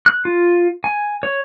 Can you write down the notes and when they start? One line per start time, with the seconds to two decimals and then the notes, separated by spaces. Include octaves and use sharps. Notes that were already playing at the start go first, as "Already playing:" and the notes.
0.06 F#6
0.25 F4
0.84 G#5
1.23 C#5